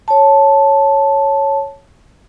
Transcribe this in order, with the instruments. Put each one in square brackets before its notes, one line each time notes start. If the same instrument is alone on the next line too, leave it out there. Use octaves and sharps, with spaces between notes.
[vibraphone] C#5 A5